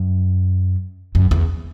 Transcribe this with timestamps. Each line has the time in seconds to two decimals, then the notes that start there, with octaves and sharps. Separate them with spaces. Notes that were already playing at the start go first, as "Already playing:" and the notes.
Already playing: F#2
1.15 F#2
1.31 E2